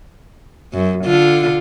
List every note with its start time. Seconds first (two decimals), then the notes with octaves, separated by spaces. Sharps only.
0.74 F#2
1.05 D3 F4